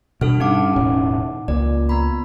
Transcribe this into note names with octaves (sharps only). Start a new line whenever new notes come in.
G2 B2 A4 F6
G2 C#3 D#4 F#5 D6
E1 A2 C#4
C#2 A#2 D5
B3 A#5 B5